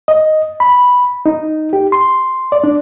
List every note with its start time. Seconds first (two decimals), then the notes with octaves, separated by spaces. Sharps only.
0.08 D#5
0.60 B5
1.26 D#4
1.73 G4
1.92 C6
2.52 D5
2.64 D4